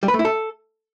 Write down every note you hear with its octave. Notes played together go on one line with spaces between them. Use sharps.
G3
B4
A3
E4
A4